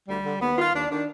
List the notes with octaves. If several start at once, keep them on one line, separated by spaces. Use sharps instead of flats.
D2 G3
D3
D#2 B3
D#3 F4
D#2 D4
D#3 D4